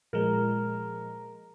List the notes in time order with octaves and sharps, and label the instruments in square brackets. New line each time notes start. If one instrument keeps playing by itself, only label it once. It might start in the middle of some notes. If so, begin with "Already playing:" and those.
[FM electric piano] A#2 F3 G#3 [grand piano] A#4